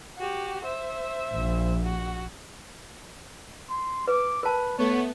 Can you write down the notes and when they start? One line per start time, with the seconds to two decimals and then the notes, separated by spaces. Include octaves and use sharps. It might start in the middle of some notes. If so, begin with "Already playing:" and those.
0.18 F#4 G4
0.65 C5 E5
1.33 A#1
1.83 F#4
3.70 C6
4.08 B4 D6
4.43 A#4 B4 A5
4.78 A3 B3 C#5